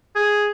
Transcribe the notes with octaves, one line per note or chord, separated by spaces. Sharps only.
G#4